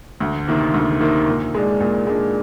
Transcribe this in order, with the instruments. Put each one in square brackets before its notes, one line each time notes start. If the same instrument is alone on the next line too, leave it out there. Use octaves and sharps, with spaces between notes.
[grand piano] D2
C3 D#3 A#3
D2
C3 D#3 A#3
A#2
G#3 D4
A#2
G#3 D4